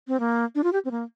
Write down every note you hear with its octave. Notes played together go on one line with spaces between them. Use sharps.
C4
A#3
D4
F4
G4
C4
A#3